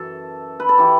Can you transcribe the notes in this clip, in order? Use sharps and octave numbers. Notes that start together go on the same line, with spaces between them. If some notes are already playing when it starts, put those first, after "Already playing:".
Already playing: F#2 E3 A4
B4
A4
E3 G4